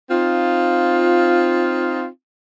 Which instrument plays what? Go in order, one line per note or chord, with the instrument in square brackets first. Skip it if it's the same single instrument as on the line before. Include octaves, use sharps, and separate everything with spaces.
[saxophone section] C4 D#4 F4